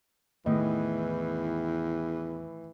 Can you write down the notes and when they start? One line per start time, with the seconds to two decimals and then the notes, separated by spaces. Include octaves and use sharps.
0.46 E2 A2 D#3 E3 D#5